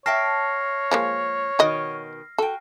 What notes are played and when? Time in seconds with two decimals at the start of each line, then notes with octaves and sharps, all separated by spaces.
0.06 C#5 E5 G5 A5 F6 A#6 C7
0.91 F3 G#3 A#3
1.59 B2 D#3 F#4 D#5
2.38 F#4 A4 G5